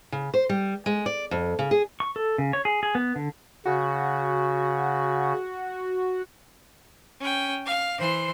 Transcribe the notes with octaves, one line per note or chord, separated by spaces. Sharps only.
C#3
C5
G3
G#3
D5
F2
C#3
G#4
C#6
A4
C#3
C#5
G#4
G#4
B3
D3
C#3 F#4
C#4 G5
F5
E3 C5 C6